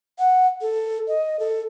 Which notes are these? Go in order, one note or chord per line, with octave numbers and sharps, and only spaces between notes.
F#5
A4
D#5
A4